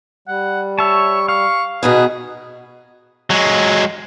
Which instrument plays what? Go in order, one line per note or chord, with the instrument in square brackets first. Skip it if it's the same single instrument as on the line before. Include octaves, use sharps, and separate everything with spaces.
[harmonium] G3 [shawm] F#5
[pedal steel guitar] C#5 E5 A5 [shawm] C#6
[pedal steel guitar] F5 [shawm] C#6
[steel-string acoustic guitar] B2 D#3 B3 [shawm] G#4
[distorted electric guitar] F#3 G#3